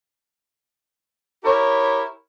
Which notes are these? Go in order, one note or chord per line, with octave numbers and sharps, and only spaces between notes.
E4 G4 A#4 C#5